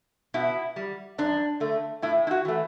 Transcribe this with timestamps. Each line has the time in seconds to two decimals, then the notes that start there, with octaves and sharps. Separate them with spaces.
0.34 B2 E4
0.76 G3
1.18 F#2 D4
1.60 D3 A3
2.02 A2 E4
2.27 E4
2.31 F#4
2.45 E3 A3